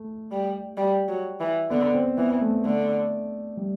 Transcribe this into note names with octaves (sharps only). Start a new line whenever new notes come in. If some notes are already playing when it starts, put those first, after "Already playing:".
Already playing: A3
G3
G3
F#3
E3
D3 B3
C4
E3 B3
A3
D3 A3
G3